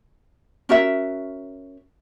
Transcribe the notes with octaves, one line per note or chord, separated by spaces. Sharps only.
C#4 F#4 A#4 E5